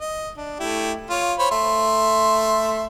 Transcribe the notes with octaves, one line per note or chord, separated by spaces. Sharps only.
D#5
D4
A3 E4 G4
F4 C#5
C5 C#5 B5
A3 E5 C6